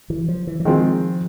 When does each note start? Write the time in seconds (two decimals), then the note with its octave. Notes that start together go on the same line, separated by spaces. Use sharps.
0.10 E3
0.28 F3
0.47 E3
0.60 E3
0.65 D#3 F3 G#3 C4 F4